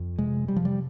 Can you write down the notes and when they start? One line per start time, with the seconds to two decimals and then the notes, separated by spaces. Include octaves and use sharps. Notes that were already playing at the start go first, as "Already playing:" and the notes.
Already playing: F2
0.18 C3 G#3
0.48 C3 G3
0.56 F3
0.65 G3